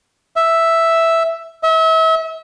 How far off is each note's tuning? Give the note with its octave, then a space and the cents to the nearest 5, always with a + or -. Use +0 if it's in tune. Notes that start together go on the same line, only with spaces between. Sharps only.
E5 +0
E5 -35